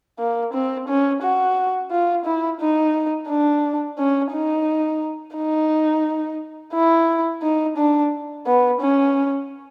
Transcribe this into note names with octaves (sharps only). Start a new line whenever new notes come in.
A#3
C4
C#4
F#4
F4
E4
D#4
D4
C#4
D#4
D#4
E4
D#4
D4
B3
C#4